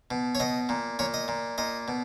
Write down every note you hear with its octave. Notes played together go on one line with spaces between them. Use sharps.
B2
C#5
B2 D#5
A#2
A#2 C#5
D#5
A#2
A#2 D#5
B2